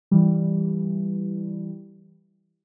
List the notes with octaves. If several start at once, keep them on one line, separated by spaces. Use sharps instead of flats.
E3 G3